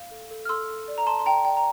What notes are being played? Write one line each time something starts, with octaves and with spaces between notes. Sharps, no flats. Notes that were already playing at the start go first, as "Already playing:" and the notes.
Already playing: F5
A4
A4
F6
A4 C6 E6
A4
D5
A#5
A4 A5 C6
C6
D5 G5 A#5
D5 G5
A#5